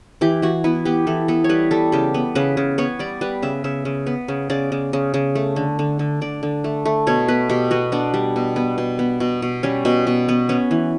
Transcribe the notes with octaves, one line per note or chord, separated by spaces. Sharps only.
E3 G4
E3 F#4
B3 E4
B3 G4
E3 A4
B3 A4
C#5
G3 B4
G3 A4
C#3 G4
B3
C#3 B4
C#3
B3 C#5
G3 D5
G3 B4
C#3 E5
C#3 E5
C#3
B3
C#3
C#3 D5
C#3
C#3
C#3
A3
D3
D3
D3
D3 D5
D3
A3
A3
B2 C#5
B3 B4
B2 G4
B3 F#4
B3 D4
G3
B2
B3
B2
B3
B2
B2
G3 C#4
B2
B2
B3
B3 C#4
E3